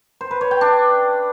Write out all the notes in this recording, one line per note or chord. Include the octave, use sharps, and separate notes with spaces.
C5
B4
C#5
G5
D4